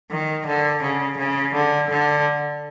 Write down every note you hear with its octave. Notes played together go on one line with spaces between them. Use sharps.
D#3
D3
C#3
C#3
D3
D3